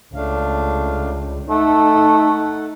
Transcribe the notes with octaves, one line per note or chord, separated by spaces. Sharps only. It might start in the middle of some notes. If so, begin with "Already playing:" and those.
C#2 A3 D4 F5
A3 D#4 A4 F#5